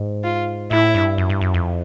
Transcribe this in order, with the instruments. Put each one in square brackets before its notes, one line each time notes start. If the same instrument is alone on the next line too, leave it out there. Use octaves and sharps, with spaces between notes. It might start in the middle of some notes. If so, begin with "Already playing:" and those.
Already playing: [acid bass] G#2
[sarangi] F4
[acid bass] A2 [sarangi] E4
[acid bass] G2
F#2
G2
F#2
F2